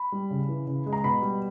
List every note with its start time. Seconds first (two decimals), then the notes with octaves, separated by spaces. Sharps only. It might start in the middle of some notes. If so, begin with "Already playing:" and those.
Already playing: B5
0.12 G3
0.30 C#3
0.49 E3
0.67 C#3
0.86 G#3
0.93 A#5
1.04 B2 B5
1.22 G3